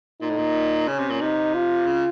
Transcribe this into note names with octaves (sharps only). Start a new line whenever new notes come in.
A#2 D#4
A2
A#2
C#3 C#4
C3
A#2
C3 D#4
F4
C#3